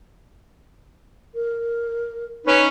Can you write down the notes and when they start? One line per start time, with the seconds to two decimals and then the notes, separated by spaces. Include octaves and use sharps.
1.35 A#4
2.45 C#4 D#4 B4